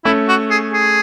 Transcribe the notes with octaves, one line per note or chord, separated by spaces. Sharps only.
A3 C#4 E4
F#4
G#4
G#4